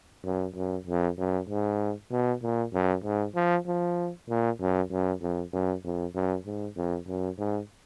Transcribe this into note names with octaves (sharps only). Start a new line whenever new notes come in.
F#2
F#2
F2
F#2
G#2
B2
A#2
F#2
G#2
F3
F3
A#2
F#2
F#2
F2
F#2
F2
F#2
G#2
F2
F#2
G#2